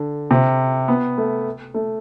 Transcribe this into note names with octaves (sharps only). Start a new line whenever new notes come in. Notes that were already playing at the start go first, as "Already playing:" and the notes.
Already playing: D3
C3
B3
A3
A3